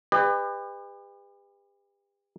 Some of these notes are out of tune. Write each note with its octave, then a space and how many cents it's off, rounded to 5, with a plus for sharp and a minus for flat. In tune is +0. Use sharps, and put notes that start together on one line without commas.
G4 +40 B4 +20 D#5 -45